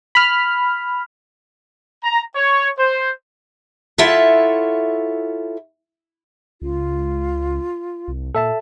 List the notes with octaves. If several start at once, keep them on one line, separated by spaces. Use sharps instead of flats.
B5 F6
A#5
C#5
C5
E4 F4 A4 C#5 E5 F#5
C#2 F4
C2
A#2 A4 E5 A5